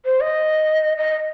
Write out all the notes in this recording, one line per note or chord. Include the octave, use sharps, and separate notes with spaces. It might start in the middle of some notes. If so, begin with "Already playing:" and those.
C5
D#5
D#5